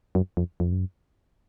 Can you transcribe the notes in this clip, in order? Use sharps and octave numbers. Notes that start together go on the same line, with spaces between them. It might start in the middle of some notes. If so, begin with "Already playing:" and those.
F#2
F2
F2
F#2